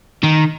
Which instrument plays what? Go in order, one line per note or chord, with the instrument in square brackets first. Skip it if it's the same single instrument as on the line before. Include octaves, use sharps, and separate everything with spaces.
[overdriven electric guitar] D#3